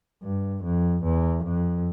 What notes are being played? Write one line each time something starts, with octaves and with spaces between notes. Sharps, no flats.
G2
F2
E2
F2